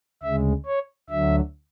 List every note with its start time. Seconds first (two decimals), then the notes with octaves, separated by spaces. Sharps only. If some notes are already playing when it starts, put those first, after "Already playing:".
0.23 D2 C#3 G#3 E5
0.66 C#5
1.10 D2 D3 F#3 E5